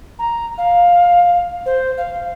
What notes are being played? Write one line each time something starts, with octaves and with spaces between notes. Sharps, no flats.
A#5
F5
C5
F5